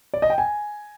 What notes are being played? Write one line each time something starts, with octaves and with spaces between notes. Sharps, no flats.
D5
D#5
G5
G#5